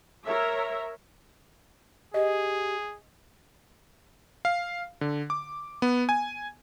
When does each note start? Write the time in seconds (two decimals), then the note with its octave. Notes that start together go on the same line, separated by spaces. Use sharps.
0.25 A#4 C#5 E5
2.14 G4 G#4 D#5
4.45 F5
5.01 D3
5.30 D6
5.82 B3
6.09 G#5